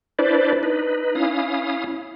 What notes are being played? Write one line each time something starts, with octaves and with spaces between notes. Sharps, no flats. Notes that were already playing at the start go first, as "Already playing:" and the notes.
D4 E4 B4 C5 D5
D#4 B4
C#4 E4 F5 D#6